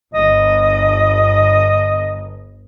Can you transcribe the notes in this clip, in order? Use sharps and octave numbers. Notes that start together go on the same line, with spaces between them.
G1 D#5